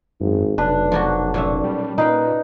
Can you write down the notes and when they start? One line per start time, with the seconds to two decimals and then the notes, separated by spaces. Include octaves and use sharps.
0.21 G#1 F#2
0.58 F1 B1 D4 B4
0.92 F3 A#3 F#4
1.34 A#2 C#4 E5
1.64 G3
1.98 A#2 D#4 B4 F5 G5